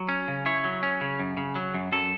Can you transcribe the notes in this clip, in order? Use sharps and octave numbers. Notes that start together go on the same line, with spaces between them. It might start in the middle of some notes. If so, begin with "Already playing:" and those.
Already playing: F#3
C#4
C#3
E4 C#5
F#3
C#4
C#3
F#2
C#3
F#3
F#2
F#2 A4